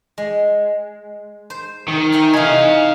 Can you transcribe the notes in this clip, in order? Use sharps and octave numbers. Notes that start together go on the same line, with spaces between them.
G#3
C5
D#3
E5 G5 G#5
E3 D#4 F5 G#5